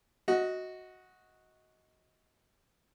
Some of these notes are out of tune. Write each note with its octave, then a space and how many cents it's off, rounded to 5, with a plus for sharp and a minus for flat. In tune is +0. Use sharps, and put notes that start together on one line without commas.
F#4 -5 D#5 +20